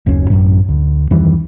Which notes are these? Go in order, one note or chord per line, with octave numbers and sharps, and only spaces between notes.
F#1 D#2 C#4
A1 F#2 A#2
D2
F2 D#3 E3 G3